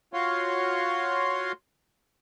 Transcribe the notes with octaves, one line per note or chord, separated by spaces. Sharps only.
F4 F#4 C#5 F5 C6